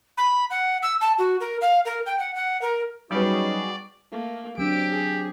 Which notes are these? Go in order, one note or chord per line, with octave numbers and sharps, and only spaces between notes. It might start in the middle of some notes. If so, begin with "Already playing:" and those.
B5
F#5
E6
A5
F#4
A#4
F5
A#4
G5
F#5
F#5
A#4
F#3 G3 B3 C#4 D#4 F#4 G#4 D5
A3 A#3
F#3 C4 D4 G4 E6 D7
G#4